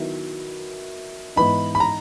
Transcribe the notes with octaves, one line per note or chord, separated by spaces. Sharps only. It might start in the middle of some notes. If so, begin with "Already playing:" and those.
Already playing: D#3 F#3 B3 E4
G#2 E3 B3 D#4 B5
B5
A#5